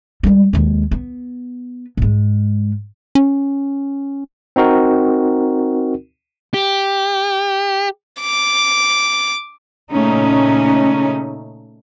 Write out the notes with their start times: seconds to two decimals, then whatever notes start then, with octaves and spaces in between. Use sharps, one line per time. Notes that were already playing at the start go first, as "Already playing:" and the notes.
0.23 G3 G#3
0.53 D#2 G#3
0.91 B3
1.97 G#2 G#3
3.15 C#4
4.56 C4 D#4 F#4 A#4
6.54 G4
8.21 D6
9.89 A#2 C#3 A3 C#4 D#4